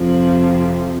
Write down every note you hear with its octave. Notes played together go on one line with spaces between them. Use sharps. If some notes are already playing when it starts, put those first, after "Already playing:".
Already playing: F2 C3 F3